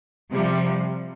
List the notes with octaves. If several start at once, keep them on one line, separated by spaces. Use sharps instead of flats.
C3 F3 G3